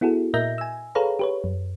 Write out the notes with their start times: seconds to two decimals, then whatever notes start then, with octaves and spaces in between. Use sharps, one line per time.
0.01 B3 E4 F#4 G#4 A4
0.34 A#2 A#4 D#5 E5 G6 A#6
0.58 G#5 E6
0.95 G#4 A4 B4 C#5 F5 A#5
1.19 G4 B4 C#5
1.44 F#2